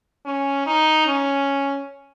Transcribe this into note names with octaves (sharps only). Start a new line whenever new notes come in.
C#4
D#4
C#4